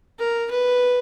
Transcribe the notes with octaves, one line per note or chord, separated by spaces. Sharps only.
A#4
B4